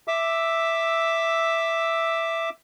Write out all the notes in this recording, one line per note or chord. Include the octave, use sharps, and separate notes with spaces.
E5 D6 E6